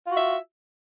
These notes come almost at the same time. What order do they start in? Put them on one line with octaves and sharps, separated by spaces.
F4 F#4 E5